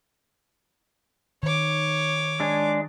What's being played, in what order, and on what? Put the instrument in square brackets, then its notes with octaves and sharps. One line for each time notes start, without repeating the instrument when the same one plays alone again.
[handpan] D#3 [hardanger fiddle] C#5 D6
[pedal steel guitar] G#3 D4